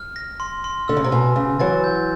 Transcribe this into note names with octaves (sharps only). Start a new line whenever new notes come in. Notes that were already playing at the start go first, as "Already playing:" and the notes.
Already playing: F6
A#6
C6
C6
D3 E6
C#3
C3
B2 G#5
C#3 E6
E3 F#3 A6
G6